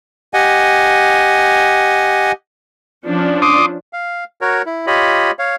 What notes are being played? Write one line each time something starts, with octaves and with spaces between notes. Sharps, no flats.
G4 D#5 F#5 G#5
F3 C#4 D4
C6 D6 D#6
F5
F#4 A#4 C#5
E4
F4 G4 C#5 D#5 B5
C#5 F5